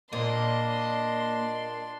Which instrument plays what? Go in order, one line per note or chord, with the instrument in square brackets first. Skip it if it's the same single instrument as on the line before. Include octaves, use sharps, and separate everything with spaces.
[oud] A#2 [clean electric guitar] A#3 C5 [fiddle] D4 C6 [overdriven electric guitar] D#5